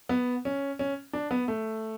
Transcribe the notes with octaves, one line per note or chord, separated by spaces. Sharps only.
B3
C#4
C#4
D4
B3
A3